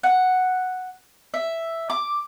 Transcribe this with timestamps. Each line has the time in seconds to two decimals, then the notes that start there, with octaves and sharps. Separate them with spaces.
0.03 F#5
1.34 E5
1.90 D6